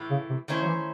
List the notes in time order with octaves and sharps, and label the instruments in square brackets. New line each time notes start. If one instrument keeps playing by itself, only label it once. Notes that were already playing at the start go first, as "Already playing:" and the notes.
Already playing: [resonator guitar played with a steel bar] A2 E3 A3
[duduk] C#3
C3
[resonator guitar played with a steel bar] D#3 A3 C#4 E4 C5
[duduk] F#3
E3